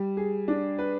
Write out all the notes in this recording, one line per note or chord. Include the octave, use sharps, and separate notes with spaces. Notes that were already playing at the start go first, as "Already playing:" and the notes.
Already playing: G3
G#4
D4
B4